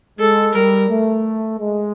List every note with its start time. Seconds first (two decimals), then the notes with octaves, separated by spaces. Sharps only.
0.19 G#3 A4
0.54 G3 A#4
0.89 A3
1.59 G#3